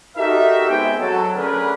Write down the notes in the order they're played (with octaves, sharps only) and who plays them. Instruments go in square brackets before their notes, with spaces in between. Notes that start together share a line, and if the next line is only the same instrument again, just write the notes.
[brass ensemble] D#4 F#4 G4 A4 A#4 E5
G#3 B3 C4 E5 G5
F#3 A4
D3 A3 C#4 G#4 A#4 B4